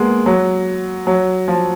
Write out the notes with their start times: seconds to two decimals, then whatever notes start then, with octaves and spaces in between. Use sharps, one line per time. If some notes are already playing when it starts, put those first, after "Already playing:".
Already playing: G#3 A#3 B3
0.26 F#3
1.07 F#3
1.48 F3